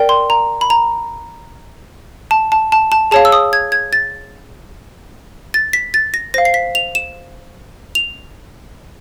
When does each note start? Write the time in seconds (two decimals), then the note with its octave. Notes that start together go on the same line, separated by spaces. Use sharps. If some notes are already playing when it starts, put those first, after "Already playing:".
Already playing: A#4 D5 G5
0.09 C6
0.30 A#5
0.61 B5
0.70 A#5
2.31 A5
2.52 A5
2.72 A5
2.92 A5
3.11 G#4 C#5 F5 A5
3.25 E6
3.32 D#6
3.53 G#6
3.72 G#6
3.93 A6
5.54 A6
5.73 B6
5.94 A6
6.14 A#6
6.34 C5 F5 A#6
6.45 C7
6.54 B6
6.75 F7
6.95 E7
7.95 F7